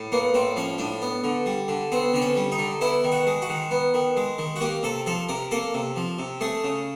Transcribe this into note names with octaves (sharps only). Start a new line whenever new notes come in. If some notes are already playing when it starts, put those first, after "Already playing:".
Already playing: A2
A#3 B3
A2 C4
F3 C#4
A2 D4
B3
D3
G3
D3
B3 C4
D3 C4
C#4
G3
D#4
D3
B3 E4
D#3
F#4
G#3
F#4
D#3
B3
D#3
G#3
D#3
F#4
A#3 G4
C3 A4
F3 A4
C3 A#4
A#3 A4
C3
F3
C3
A3 G#4
C#3